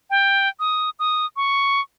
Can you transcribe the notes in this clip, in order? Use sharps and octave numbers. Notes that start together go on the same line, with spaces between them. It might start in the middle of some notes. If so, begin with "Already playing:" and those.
G5
D#6
D#6
C#6